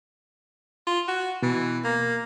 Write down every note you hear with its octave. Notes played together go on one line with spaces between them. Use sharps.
F4
F#4
B2 E3
A#3